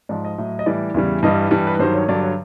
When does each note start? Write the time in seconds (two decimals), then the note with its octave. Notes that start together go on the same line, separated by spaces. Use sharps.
0.09 G#2 F3 D5
0.25 D#5
0.38 A2 F#3
0.59 D#5
0.66 A2 E3 G3 D5
0.94 E2 C#3 E3 G3
1.23 G2 E3 G3 D#5
1.51 G2 E3 G3
1.67 B4
1.79 G2 D#3 F#3 C5
1.94 C#5
2.08 G2 D3 F#3 D5
2.22 C#5